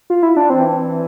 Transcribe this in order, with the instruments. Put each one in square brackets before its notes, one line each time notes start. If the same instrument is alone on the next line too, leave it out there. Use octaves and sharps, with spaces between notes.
[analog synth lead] F4
E4
D4
[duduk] E3 [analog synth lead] C4